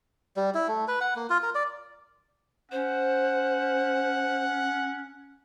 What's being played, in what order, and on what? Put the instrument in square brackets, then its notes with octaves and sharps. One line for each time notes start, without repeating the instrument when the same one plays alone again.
[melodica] G3
E4
A3
B4
F#5
A#3
F4
A#4
D5
[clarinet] C#4 [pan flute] C5 [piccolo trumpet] F#5